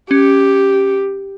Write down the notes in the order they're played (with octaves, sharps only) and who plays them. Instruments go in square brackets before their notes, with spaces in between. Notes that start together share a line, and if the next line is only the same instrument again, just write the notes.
[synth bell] C#4 C#7 [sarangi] G4